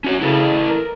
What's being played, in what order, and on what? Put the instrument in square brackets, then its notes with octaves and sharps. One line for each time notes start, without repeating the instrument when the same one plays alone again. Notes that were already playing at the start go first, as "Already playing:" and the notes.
[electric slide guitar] C#4 F#4 C#5
[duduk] C#3 [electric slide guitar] E4 A4 B4
[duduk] A#4